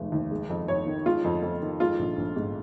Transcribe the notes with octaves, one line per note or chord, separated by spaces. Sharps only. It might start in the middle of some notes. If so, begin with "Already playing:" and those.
Already playing: F1 D#2 G#3
D#2
G#3
F2
F2 C#5
D#3
G#3 F4
F2
F2
D#3
G#3 F4
A#1
A#1
G#2